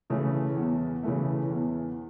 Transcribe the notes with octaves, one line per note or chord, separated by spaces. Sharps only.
C#3 E3 A3
E2
C#3 E3 A3
E2